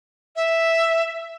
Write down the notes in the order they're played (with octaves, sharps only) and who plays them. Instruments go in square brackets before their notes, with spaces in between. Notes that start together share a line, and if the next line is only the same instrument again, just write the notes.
[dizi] E5